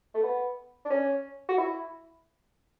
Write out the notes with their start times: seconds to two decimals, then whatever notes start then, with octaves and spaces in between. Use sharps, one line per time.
0.14 A3
0.23 B3
0.85 D4
0.90 C#4
1.48 F#4
1.58 E4